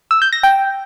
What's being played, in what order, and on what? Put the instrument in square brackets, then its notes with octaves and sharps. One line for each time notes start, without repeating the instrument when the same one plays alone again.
[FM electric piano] E6
G6
A#6
G5